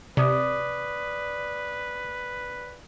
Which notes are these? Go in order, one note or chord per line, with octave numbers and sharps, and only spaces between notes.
C3 B4 D5 D6 D#6